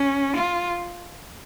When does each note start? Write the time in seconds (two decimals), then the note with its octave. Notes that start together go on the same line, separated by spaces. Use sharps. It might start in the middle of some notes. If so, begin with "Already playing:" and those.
Already playing: C#4
0.37 F4